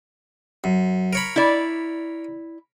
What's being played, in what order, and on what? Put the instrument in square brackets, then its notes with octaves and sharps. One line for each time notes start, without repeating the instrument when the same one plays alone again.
[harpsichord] F#2
A#4 C#5 B5
[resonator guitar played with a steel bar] E4 D5